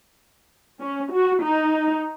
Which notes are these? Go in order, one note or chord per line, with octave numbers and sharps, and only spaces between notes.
C#4
F#4
D#4